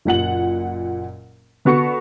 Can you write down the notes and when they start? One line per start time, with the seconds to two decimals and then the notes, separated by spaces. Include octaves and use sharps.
0.05 F#1 A#2 F#5 F#7
1.65 D3 B3 F#4 C#6 C#7